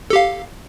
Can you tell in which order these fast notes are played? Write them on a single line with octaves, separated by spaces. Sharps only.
A4 G4 F5